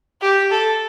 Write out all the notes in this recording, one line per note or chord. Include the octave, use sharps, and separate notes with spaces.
G4
A4